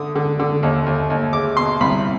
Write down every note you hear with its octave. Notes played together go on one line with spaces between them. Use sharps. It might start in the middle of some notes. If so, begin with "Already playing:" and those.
Already playing: D3 D#6
D3
D3
D#2
D#2
D#2
G#3 D6
B2 C6
C2 B5